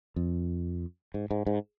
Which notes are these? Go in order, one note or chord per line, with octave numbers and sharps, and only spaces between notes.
F2
G#2
G#2
G#2